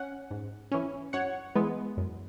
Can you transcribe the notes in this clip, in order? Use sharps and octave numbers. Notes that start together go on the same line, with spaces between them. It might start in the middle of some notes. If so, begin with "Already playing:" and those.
Already playing: C#4 F#5
G#2
E3 C#4
F#2 C#5 F#5
E3 G#3 B3
F#2